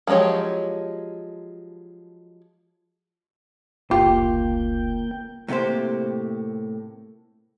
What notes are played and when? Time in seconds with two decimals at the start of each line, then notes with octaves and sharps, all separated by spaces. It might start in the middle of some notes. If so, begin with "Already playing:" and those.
0.07 F3 F#3 G#3 G4 C#5
3.91 F1 C#2 A#3 F4 G4 G5
5.48 A2 C3 A#3 G4 C5